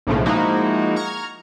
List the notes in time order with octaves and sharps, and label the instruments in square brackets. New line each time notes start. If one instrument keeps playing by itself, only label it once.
[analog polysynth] B1 A2 C#3 F3 G#3 A3
F3 G#3 A#3 D#4 E4 F#4
A#5 C#6 F6 G#6